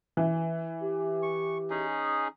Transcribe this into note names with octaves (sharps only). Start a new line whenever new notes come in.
E3
G4
C#6
C#4 D#4 G#4